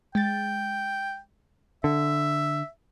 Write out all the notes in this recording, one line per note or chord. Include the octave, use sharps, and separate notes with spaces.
G#3 G5 A6
D3 E5